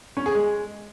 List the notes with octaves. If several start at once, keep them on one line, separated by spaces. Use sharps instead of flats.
C#4
G#4
G#3